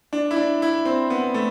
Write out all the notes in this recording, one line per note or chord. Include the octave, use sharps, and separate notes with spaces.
D4
E4
D4
E4
C4
B3
A3